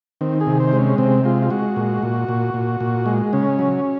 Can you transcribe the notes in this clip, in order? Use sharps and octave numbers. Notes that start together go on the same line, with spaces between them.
D#3 C4
G#4
C3
C5
G#3
C#4
C3 C4
G#3 F4
F4
G#3 F#4
A#2
A#2
A#2
A#2
A#2
G#3
C#3 C#4
F#3